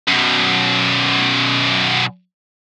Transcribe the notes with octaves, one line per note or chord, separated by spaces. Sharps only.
F#2 B2